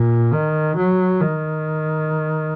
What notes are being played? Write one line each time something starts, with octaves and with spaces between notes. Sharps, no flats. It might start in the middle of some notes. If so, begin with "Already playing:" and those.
Already playing: A#2
D#3
F#3
D#3